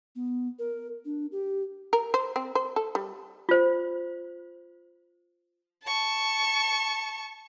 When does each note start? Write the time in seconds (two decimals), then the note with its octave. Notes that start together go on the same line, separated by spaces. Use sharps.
0.16 B3
0.59 A#4
1.05 D4
1.32 G4
1.93 A#4
2.14 C5
2.36 C4
2.55 C5
2.76 A4
2.95 G3
3.49 F4 C5
5.84 A5 C#6